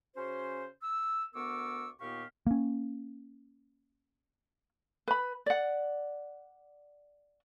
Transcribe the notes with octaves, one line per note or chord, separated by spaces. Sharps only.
C#3 C#4 F#4 C5
E6
D2 B3 A#4 C#6 D6 E6
D#2 A#2 B3 G4 F5 C#6
A#3 C#4
B4 B5
D5 F#5